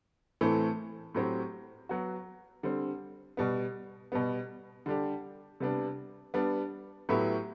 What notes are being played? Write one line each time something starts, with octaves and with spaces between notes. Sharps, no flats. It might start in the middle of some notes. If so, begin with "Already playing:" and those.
A2 E3 A3 C4
A2 F#3 C4 G4
F#3 B3 F#4
D3 G3 C4
B2 G3 B3
B2 G3 B3
D3 G3 D4 G4
C3 G3 B3 D4
G3 B3 D4
A2 F#3 B3 E4 G4